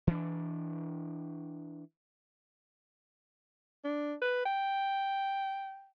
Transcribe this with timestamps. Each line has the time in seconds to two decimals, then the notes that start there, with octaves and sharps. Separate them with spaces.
0.07 E3 D4
3.84 D4
4.22 B4
4.46 G5